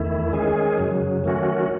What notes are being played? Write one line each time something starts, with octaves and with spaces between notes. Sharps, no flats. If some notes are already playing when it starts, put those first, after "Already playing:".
Already playing: E2 D#3 A3 E4
D#3 G#3 C#4 G#4
F#2 C#3 F#3
D#3 F#3 A3 C#4 F#4